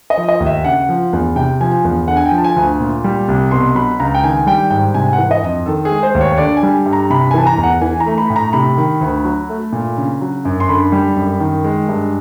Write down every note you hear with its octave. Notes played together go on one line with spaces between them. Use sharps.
D#5
F3
D#5
D#2
E5
C#3 F#5
F3
E2
C3 G5
F3 G#5
E2
D3 F#5
G#5
G5
F3
A5
G#5
D2
A#2
G3
C2
B2 C6
F#3 B5
C#2 A#5
G5
D#3 G#5
G3 G5
G#2 G5
C3 G#5
F#5
E3
D#5
F2
D#3 A4
G#4
G#3
C5
D#2
C#5
C#5
D3 D5
G#5
G3
G2
A#5
C3 B5
G#5
E3 A5
A#5
E2
F#5
E3 G#5
A#5
A3
B5
A2
A#5
C3 B5
D#3
D2
F#3
A3
A#2
C#3
F#3
F#2
C6
D3 B5
G3
F#2
D#3
G#3
G2